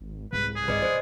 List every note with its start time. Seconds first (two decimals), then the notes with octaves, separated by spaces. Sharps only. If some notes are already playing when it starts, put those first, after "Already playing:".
0.01 G#1
0.33 C2 G#2 B4
0.56 G#4
0.68 G#1 B4 D5 D#5
0.82 E3 C5 D#5